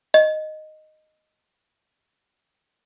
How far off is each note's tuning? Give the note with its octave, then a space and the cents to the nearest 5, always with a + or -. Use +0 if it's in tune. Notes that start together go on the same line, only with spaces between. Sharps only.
D#5 -5